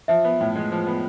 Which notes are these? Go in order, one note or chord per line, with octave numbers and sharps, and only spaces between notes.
F3 E5
B3
A2
G#3
F3
B3